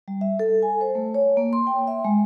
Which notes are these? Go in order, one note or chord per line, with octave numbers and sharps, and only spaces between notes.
G3
E5
A4
G#5
C5
A3
C#5
A#3
C6
G5
E5
G#3